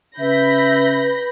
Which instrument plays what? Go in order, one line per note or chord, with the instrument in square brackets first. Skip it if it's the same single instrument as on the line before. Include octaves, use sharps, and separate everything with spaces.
[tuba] C#3 [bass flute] B4 [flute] E5 [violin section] B5 G6 A#6